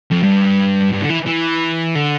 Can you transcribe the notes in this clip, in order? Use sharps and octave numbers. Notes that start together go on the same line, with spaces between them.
F2
G2
G2
D3
E3
E3
D3